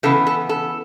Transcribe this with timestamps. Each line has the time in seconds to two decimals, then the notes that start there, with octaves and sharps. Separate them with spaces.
0.03 C#3 E3 B3 A4
0.27 A4
0.49 A4